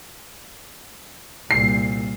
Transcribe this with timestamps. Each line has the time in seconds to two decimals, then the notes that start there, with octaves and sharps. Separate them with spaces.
1.51 C2 A#2 C7